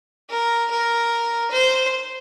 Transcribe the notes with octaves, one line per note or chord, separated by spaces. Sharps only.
A#4
A#4
C5